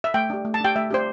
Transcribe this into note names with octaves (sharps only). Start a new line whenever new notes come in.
E5
A3 G5
D4 G4
A3
A5
D4 G4 G5
A3 E5
D4 G4 C5